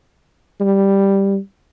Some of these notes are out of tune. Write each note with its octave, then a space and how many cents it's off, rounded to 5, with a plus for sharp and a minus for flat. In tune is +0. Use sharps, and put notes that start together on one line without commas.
G3 +0